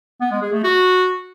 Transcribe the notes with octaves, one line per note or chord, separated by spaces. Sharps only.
B3
G#3
G#4
A3
F#4